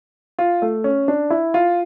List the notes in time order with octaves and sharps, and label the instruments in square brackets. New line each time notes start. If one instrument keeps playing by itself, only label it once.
[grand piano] F4
A3
C#4
D4
E4
F4